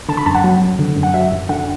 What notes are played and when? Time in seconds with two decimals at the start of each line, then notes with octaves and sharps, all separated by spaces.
0.09 D3 A5
0.17 B5
0.26 F#2 A5
0.35 F#5
0.44 F#3
0.62 F#2
0.79 D3
0.97 F#2
1.03 F#5
1.14 F#3 E5
1.32 F#2
1.49 D3 F#5